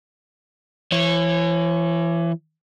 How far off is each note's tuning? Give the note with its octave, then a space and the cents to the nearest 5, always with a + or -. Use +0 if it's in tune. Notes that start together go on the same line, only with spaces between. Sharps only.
E3 +30 C#5 -20